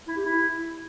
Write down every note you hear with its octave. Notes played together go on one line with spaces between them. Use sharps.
E4
G4
E4